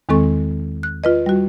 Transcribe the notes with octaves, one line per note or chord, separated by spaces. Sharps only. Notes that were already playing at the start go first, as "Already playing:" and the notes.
E2 D#3 G#3 C4 A4 C#6
F#6
F4 B4 D#5
G3 F#4